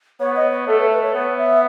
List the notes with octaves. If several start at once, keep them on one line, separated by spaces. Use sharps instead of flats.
B3 C#5
D#5
C#5
A3 A4
B4
B4
C#5
B3 C#5
E5